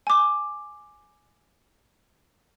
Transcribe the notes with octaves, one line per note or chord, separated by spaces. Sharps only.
G#5 D6